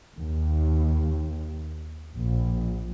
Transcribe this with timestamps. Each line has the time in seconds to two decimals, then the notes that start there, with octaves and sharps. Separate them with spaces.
0.16 D#2
2.16 A#1